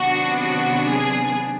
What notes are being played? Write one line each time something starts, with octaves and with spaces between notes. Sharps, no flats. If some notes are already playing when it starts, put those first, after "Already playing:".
Already playing: C3 D#3 F#3 B3 D4 F#4
F#4
G#4